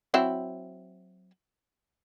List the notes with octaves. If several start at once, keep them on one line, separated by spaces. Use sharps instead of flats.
F#3 C4 E4